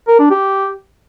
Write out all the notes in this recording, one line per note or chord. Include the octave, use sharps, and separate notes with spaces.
A#4
D4
G4